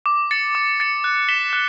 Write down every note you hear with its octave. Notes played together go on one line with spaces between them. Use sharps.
D6
A6 C#7
D6
A6 C#7
F#6
B6 E7 G7
F#6